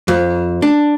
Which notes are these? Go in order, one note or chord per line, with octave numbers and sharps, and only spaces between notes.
F2
D4